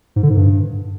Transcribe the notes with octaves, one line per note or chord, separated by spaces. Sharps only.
G#2
D3
G#2
G2